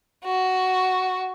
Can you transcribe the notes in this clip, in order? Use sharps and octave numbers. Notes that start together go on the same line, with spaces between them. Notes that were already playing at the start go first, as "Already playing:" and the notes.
F#4